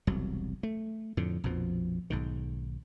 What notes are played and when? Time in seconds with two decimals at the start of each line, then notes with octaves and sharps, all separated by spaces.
0.07 E1 C2 F#3
0.63 A3
1.17 F2 A2 D3
1.44 A#1 F2 B2 F3
2.10 B1 G#2 D#3